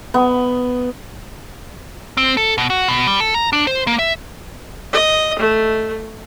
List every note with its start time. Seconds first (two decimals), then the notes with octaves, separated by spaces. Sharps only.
0.14 B3
2.17 C4
2.37 A4
2.58 B2
2.70 F#4
2.88 B2
3.07 G3
3.20 A4
3.34 A#5
3.53 D4
3.67 C5
3.87 A#3
3.99 E5
4.93 D#5
5.39 A3